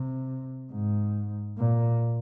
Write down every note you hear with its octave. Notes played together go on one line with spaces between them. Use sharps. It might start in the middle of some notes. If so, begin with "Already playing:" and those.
Already playing: C3
G#2
A#2